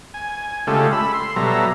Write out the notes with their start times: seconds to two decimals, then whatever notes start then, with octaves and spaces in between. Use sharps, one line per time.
0.14 G#5
0.67 C#3 G#3 A3 F4 G4 A4
0.92 B5 E6
1.14 C6
1.36 B2 F#3 G3 A4 E5 A#5